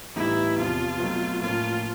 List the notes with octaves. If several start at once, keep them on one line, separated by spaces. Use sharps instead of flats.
A2 E3 G3 B3 D#4 E4
E2 C3 F3 F4
B2 F#3 A3 C4
A2 F3 A#3 C#4 F4